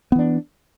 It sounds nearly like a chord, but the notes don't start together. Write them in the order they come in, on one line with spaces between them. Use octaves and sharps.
B3 E3 D4